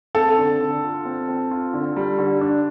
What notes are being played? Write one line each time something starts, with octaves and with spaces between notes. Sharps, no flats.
C4 A4
D3
D3
F4
C4
C4
F4
D3
G3
D3
D4